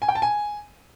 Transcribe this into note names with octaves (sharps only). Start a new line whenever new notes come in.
G#5
G5
A5
G#5